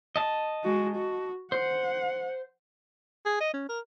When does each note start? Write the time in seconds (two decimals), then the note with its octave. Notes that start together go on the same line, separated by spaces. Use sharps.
0.16 D#5 A5
0.64 G#3 F#4
0.95 F#4
1.52 C5 F#5
3.26 G#4
3.41 D#5
3.54 C#4
3.69 A#4